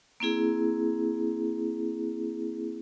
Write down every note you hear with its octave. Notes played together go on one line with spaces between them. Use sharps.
A#3 C4 E4 G#4